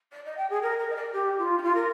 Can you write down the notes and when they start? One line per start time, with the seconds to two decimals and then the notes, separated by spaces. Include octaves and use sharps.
0.12 D5
0.25 D#5
0.37 G5
0.50 G#4
0.62 A#4
0.78 A#4
0.89 D#5
0.95 D5
1.12 G4
1.37 F4
1.58 D#4
1.62 F4
1.74 A#4